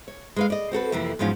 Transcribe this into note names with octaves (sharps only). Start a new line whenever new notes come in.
C#5
G#3 B4 F5
D5 D#5
C4 F#4 A4 B4
F2 C3 E3 F3 A#3
E2 G#2 F3 F#3 C#4 F5